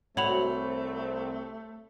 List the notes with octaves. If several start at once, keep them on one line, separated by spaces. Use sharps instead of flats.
C2 A3 C4 F#4 C#5 B5 F7